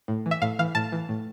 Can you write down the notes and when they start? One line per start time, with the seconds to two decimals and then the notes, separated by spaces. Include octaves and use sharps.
0.08 A2
0.26 E3
0.31 E5
0.42 A2 F5
0.59 E3 F5
0.75 A2 A5
0.92 E3
1.09 A2